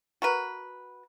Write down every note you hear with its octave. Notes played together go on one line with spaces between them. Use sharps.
F#4 A#4 B4